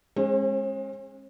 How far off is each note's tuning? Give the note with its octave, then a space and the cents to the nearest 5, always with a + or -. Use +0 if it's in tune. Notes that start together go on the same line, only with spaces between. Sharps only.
G#3 +0 C#4 -45 C5 +25